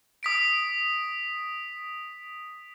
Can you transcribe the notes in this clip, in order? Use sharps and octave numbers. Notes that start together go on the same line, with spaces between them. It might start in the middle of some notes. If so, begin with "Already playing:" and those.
D#6 B6 D7